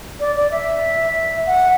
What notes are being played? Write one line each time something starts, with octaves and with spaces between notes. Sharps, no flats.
D5
D5
E5
F#5